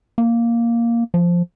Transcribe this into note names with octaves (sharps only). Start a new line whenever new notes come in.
A#3
F3